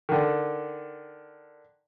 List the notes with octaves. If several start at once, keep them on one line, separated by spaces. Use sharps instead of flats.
D3 D#3